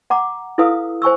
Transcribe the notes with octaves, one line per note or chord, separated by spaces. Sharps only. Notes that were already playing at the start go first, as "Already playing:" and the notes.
F#5 A#5 D6
E4 A4 B4 F5 D#6 E6
C5 G#5 C#6 E6